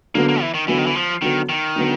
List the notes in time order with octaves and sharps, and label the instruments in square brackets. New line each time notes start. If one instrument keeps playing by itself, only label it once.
[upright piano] D3 F#3 B3 [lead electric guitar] A#3
[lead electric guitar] A#3
E3
D#3
[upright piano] D3 F#3 B3 [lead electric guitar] E3
[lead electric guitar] D#3
E3
F3
[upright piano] D3 F#3 B3 [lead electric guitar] D#3
[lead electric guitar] D#3
[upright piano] D3 F#3 B3